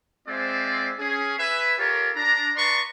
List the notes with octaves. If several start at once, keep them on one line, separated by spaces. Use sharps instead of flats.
G#3 C4 F4 C5 D5 E5
C#4 G#4
B4 E5 G#5
F4 G4 A4 A#4 C#5
D4 A#5
B4 D5 A5 A#5 C6 C#6